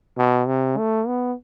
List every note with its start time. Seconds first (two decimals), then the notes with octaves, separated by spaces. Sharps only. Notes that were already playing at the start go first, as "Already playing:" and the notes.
0.18 B2
0.48 C3
0.78 A3
1.08 B3